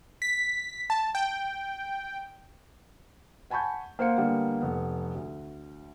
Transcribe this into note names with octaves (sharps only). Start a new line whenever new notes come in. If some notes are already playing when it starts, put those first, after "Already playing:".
B6
A5
G5
F#5 G#5 A5 B5 C#6 G6
A#3 C5 F5 F#5 C#7
D3 G3 A#3 B3
F1 B3
D2